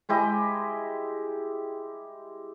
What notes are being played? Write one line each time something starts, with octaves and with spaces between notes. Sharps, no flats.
G#3 E4 G4 D#5